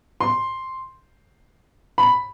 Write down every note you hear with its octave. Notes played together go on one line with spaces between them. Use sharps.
C6
B5